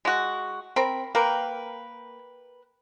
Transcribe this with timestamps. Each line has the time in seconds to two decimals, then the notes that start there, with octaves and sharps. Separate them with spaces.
0.05 G#3 F#4
0.76 C4 A#4 B5
1.15 A#3 A#4 B4 G5